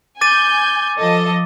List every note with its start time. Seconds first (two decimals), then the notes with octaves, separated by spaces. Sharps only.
0.21 G#5 D6 G6 A6 D#7
0.99 F3 A4 D#5 D6